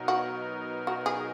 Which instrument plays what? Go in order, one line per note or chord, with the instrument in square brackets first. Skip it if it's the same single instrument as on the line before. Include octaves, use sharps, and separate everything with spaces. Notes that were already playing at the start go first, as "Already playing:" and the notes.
Already playing: [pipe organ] B2 F#3 B3 D#4 A#4
[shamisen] F#4
F#4
G#4